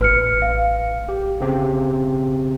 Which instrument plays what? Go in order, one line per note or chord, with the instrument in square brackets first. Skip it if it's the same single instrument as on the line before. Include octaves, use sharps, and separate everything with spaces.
[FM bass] A1 [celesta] B4 F6 C#7
[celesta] F5
[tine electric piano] G4
C#3 C4 G4